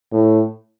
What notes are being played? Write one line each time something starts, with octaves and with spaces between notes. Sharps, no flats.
A2